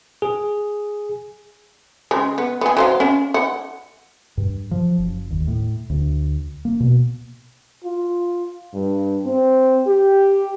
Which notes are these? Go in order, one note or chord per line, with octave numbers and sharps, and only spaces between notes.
G#4
C#3 G#3
B3
B3 G#4
F#3 C5 F5
C#4
F#5
G2
F3
F#1
D#2
A2
D2
A#3
B2
F4
G2
C4
G4